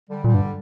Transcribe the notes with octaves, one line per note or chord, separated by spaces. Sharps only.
D3 G3
A#2 D3 G3
G2